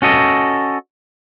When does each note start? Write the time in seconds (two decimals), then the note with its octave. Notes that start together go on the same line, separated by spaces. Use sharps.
0.02 C#4 F#4 A4 D#5